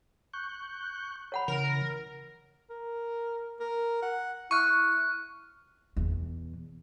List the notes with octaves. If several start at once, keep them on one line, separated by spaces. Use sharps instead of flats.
C#6 F#6 G6
C#5 F#5 B5
C#3 E3 A#4
A#4
A#4
F#5
E4 C#6 F6 F#6 D#7
E2 B2